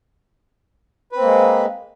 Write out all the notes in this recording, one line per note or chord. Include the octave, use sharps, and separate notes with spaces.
G#3 A#3 C4 B4